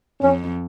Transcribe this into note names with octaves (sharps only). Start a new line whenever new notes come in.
F2 C#4